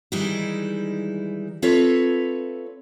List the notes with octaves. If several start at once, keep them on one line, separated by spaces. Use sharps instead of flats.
D#3 E3 G3 G#3 D#4 E4
C4 F4 A4 B4 C#5 E5